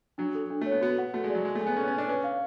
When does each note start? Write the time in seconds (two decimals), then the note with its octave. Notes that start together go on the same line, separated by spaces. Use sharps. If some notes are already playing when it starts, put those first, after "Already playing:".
0.18 F#3 D4
0.35 A4
0.50 D4
0.61 A3
0.66 C#5
0.71 B3
0.81 B3 F#4
0.98 F#5
1.13 A3 F#4
1.24 G#3
1.30 D5
1.35 F#3
1.45 G#3 G#4
1.55 A3
1.61 G#5
1.67 B3
1.77 C#4 A4
1.83 B3
1.88 C#4
1.93 D4 G#5
2.08 C#4 B4
2.24 F5